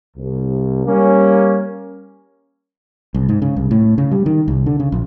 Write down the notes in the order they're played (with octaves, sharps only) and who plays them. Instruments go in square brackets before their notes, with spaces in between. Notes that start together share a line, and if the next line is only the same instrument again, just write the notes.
[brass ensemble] C2
G3 A#3 C#4
[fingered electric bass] C2
G#2
C#3
C2
A2
C#3
G3
D#3
C2
D3
C#3
A#1